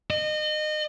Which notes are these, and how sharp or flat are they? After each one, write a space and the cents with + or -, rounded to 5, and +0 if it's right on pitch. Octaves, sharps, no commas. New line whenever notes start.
D#5 -30